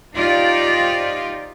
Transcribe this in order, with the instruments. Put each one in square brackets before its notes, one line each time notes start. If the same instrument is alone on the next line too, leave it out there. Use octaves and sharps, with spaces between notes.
[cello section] D#4 F4 G4 C5 D5 F5